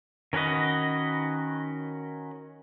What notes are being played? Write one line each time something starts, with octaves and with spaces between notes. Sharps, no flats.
D#3 C#4 F#4 B4 D#5